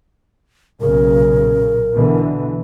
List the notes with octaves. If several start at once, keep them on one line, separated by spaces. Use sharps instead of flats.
B1 A#2 C#3 A#4
B2 D3 E3